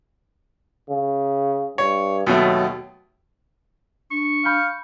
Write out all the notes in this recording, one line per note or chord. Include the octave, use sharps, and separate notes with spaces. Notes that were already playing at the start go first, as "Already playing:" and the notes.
C#3
G2 C#5
D#2 B2 F#3 A3
D4 C#6
F5 B5 G6